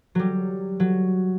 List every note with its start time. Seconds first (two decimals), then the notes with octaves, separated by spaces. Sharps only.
0.15 F#3 G3
0.80 F#3